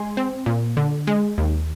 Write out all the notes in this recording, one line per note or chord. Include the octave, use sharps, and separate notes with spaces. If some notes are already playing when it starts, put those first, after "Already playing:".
Already playing: G#3 G#5 C6
C4
A#2
D3
G#3
D#2